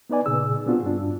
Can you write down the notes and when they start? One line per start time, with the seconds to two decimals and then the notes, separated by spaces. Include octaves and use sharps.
0.10 B3 D#4 B4 D5 G#5
0.26 A#2 C#3 G#4 E6
0.66 B3 C4 D4 F4 F#4
0.83 G2 D4